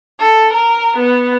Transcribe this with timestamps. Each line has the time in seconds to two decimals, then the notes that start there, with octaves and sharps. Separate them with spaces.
0.18 A4
0.53 A#4
0.97 B3